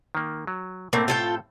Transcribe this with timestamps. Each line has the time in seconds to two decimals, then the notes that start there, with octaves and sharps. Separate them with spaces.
0.15 D#3 A#3
0.47 F#3
0.93 A2 A3 A#3 C4
1.08 F4 A4 G5